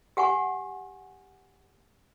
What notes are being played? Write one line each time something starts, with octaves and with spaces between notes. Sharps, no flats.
G4 F#5 G#5 C#6